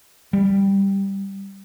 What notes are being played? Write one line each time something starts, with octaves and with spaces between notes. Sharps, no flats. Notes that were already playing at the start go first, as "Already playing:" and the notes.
G3